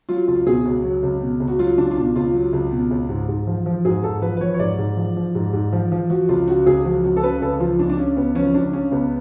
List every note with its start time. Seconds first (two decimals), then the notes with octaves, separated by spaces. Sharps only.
0.09 F#3 F4
0.28 C#2 F4
0.47 B2 G#4
0.65 C#2 F#4
0.84 F#3
1.03 C#2
1.22 B2
1.40 C#2
1.48 F#4
1.59 F#3 F4
1.78 C#2 D4
1.91 F4
1.97 B2 D4
2.16 C#2 F4
2.34 F#3
2.53 C#2
2.72 B2
2.91 C#2
3.09 G#2
3.28 G#2
3.47 F3
3.66 F3
3.85 G#2 G#4
4.03 G#2 A4
4.22 F3 B4
4.37 B4
4.41 F3 C#5
4.54 C#5
4.59 G#2 D5
4.78 G#2
4.97 F3
5.16 F3
5.35 G#2
5.53 G#2
5.72 F3
5.92 F3
6.10 F3 F#4
6.29 C#2 F4
6.48 C#3 F#4
6.66 C#2 G#4
6.85 F3 F#4
7.04 C#2 F#4
7.17 A4
7.22 C#3 B4
7.42 C#2 A4
7.60 F3 F4
7.79 C#2 D4
7.90 D4
7.98 C#3 C#4
8.17 C#2 B3
8.35 F3 C#4
8.54 C#2 D4
8.73 C#3 C#4
8.91 C#2 B3